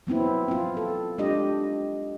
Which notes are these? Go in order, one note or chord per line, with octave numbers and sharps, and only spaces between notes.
F#3 B3 C4 E4
C4 F4
A4
G#3 D4 F4 G4 D#5